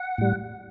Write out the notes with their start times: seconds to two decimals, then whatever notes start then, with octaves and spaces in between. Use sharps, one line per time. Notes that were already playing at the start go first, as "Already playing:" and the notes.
Already playing: F#5
0.18 A2 G3